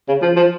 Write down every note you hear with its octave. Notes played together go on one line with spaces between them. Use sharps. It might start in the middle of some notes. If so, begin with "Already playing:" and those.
C#3
F3
F3